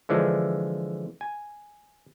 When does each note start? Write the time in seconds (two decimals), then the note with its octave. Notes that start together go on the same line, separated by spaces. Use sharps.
0.09 D3 E3 F3 G#3 D4
1.21 G#5